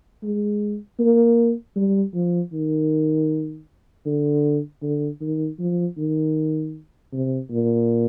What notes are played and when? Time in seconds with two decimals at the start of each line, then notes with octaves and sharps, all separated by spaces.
0.23 G#3
0.99 A#3
1.76 G3
2.14 F3
2.53 D#3
4.06 D3
4.82 D3
5.21 D#3
5.59 F3
5.98 D#3
7.13 C3
7.51 A#2